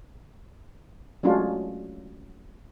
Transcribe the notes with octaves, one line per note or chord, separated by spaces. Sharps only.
F#3 G#3 A3 C#4 D4 F4